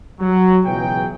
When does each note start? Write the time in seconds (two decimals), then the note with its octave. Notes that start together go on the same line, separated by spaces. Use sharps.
0.20 F#3
0.65 C#2 B2 E3 F#3 G#4 G5